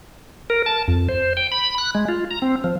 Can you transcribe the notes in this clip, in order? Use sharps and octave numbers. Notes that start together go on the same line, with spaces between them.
A#4
A5
F2
C5
G5
B5
F#6
G#3
F4
A#5
C4
F3